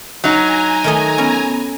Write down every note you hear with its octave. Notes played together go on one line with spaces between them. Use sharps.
F#3 D#4 G#5 A#5
D#3 A3 D#5
B3 C#4